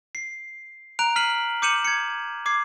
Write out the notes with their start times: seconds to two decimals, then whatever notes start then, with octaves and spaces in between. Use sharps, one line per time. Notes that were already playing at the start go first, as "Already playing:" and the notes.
0.15 C7
0.99 A#5 F#6 D7 F7
1.16 F6 B6 C7 D#7 F#7
1.62 D6 G6 C#7 D#7 E7 F#7
1.85 G#6 C#7
2.46 D6 G#6 C7